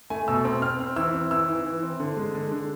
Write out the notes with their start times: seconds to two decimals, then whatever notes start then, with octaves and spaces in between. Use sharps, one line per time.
0.10 A3 G#5
0.28 B2 E6
0.44 C4 E6
0.62 C4 F6
0.79 C4
0.96 E3 E6
1.14 C4
1.31 E3 E6
1.48 E3
1.66 E3
1.83 C4
2.00 D3
2.17 G#3
2.35 D3
2.52 D3